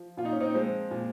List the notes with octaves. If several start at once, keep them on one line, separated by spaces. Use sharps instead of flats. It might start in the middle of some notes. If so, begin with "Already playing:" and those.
Already playing: F3
A#2 F4
D#4
C#4
C4 D#4
F3 G#3 C4
A#2